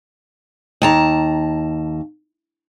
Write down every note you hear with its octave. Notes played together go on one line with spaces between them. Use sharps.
D#2 A5 A#5